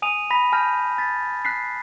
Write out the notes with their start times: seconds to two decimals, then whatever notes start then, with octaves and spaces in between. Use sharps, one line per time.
0.02 G#5 D#6 D#7 F7
0.31 B5 A#6 B6
0.52 G#5 A5 F6 G6 A#6
0.98 A6 B6
1.45 F#6 B6 C7